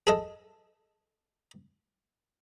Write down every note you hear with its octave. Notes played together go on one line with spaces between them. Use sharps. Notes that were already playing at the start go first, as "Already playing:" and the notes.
G#4 A4 D#5